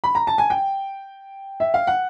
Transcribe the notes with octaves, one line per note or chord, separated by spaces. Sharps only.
B5
A#5
A5
G#5
G5
E5
F5
F#5